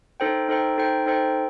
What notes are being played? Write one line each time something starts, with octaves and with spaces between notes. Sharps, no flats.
D#4 A4 C5 G5
D#4 A4 C5 G5
D#4 A4 C5 G5
D#4 A4 C5 G5